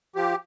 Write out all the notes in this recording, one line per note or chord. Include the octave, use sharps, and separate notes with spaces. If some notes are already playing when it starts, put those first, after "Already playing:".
F3 G4